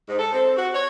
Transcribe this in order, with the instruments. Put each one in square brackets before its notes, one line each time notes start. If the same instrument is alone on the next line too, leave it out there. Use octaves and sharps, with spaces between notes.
[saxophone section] G#2
A4
C4
F#4
C#5